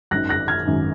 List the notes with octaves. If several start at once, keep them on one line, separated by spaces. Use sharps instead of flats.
G#1 F#2 D#3 F#6 A#6
F#6 A#6
F6 G#6
G#1 F#2 D#3